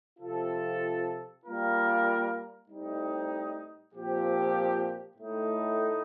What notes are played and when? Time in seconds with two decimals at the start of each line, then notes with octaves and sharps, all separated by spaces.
0.18 C3 F3 C4 F4 A4
1.43 G3 A#3 F4 A#4
2.68 A2 G3 C4 D#4
3.92 A#2 F3 C4 G4
5.18 A2 A3 D#4